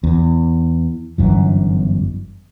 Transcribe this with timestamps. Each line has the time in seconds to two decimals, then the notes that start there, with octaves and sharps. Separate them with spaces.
0.04 E2
1.18 G1 F#2 E3